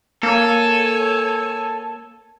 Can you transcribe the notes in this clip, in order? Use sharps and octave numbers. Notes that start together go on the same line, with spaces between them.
A#3 A4 C#5 G#5